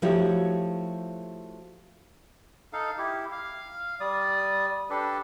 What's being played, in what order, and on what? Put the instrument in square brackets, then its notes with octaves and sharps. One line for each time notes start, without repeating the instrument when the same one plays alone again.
[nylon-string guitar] F3 A3 E4 F#4 G4 C#5
[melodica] D#4 A4 F5
E4 G4
F5
G3 D5 D#6
D4 G4 A4 B4